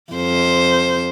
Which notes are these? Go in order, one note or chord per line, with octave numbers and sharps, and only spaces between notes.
F2 C5